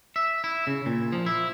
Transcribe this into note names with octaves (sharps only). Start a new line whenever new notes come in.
E5
E4
C#3
A#2
F3
E4